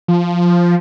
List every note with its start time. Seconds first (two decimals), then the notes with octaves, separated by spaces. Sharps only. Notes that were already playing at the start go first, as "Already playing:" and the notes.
0.08 F3